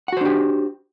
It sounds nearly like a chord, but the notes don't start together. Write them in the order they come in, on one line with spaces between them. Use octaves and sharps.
F#5 F#4 C5 D4 G4